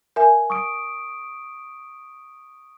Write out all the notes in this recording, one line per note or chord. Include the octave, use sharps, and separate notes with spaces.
A#4 E5 G#5
C#6 D#6 D7